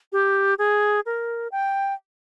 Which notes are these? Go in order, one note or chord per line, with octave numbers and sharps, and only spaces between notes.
G4
G#4
A#4
G5